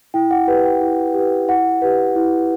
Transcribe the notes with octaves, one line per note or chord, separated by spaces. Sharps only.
E4 G5
F#5
G4 B4
G5
E4
G4 B4
E4 F#5
G4 B4
E4